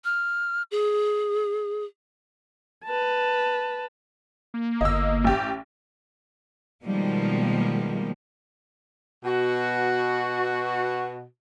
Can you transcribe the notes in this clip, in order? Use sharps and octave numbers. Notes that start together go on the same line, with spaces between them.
F6
G#4
B4 A5
A#3
G1 D#5 E6
A1 G4
B2 D#3 F3 G3 G#3 A#3
B2 F#4